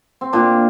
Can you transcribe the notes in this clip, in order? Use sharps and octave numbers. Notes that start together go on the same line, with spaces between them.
C4
A#2 D4